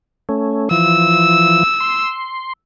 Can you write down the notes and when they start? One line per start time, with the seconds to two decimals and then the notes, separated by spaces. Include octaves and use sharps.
0.29 A3 C#4
0.71 E3 F3 E6
1.80 C6